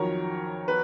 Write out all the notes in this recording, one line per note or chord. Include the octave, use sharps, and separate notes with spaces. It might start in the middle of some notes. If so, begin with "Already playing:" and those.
Already playing: F2 D#3 F#3 A#4 C#5
B4